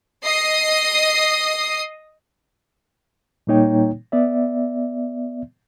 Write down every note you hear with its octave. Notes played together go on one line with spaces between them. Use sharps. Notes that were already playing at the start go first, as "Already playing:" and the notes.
D#5 D#6 C7
A#2 G3 A#3 D#4 C#5 G5
B3 D5 E5